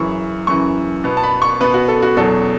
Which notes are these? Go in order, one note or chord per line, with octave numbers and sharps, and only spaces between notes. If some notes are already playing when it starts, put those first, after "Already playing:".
Already playing: F#2 C#3 E3 C#6
F#2 C#3 E3 C#6
B2 B3
A5
B5
C#6
B2 B3 B4
F#4
A4
F#4
E2 B2 F#3 A4